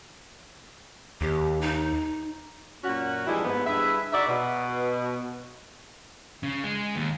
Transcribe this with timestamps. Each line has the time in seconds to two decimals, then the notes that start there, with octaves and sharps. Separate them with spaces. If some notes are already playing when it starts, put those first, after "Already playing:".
1.21 D#2 G4
1.61 D#4
2.84 F#2 A#2 C#4 F#4
3.27 E3 F3 G3 G#3 D4 E4
3.45 D#2 G#2 B3
3.66 G2 E4 G#4 B4 E5
4.12 D#4 F#4 G#4 D5 E5
4.27 B2
6.43 C#3
6.64 G#3
6.96 D#2